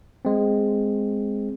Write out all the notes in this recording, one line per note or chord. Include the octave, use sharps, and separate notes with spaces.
G#3 C4